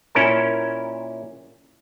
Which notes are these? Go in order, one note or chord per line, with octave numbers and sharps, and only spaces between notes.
A#2 C#4 E4 A#4 A5